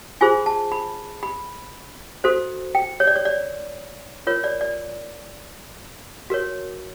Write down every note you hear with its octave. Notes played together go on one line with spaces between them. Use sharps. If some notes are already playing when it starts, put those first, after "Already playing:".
F4 G#4 C5 G#5
A5
B5
B5
F#4 A4 C5
G5
C#5
D5
C#5
D5
F4 A#4 C#5
D5
D5
F#4 A#4 C#5